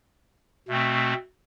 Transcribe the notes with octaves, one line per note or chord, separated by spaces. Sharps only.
B2 A3 C4